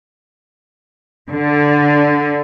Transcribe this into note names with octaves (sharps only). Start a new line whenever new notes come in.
D3